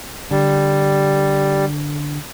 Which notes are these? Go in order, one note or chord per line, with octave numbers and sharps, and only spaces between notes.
D3 G3